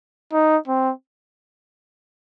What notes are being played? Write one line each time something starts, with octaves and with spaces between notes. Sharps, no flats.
D#4
C4